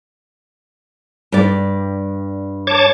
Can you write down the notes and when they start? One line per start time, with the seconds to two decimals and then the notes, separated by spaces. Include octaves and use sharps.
1.32 G2 D5
2.67 C#5 A5 D6